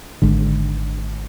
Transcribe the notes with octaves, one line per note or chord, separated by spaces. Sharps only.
G#1 G#2 D3